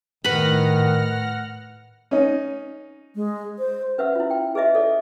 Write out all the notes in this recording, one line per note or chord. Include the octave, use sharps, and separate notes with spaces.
A2 D#3 B4 F#5 B5 F6 A#6
C#4 D#4
G#3
C5
C#4 B4 E5 F#5 E6
E4 F4
G5
G#4 B4 D#5 E5
A4 D5